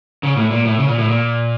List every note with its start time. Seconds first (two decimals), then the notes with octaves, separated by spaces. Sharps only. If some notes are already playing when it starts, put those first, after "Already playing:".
0.23 C#3
0.37 A2
0.51 A#2
0.65 A2
0.79 C#3
0.88 A#2
0.98 A2
1.08 A#2